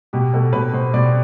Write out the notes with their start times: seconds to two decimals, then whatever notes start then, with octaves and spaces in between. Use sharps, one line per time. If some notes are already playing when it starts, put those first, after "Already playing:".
0.13 B2 G4
0.33 B2 A4
0.53 B2 B4
0.73 B2 C5
0.94 B2 D5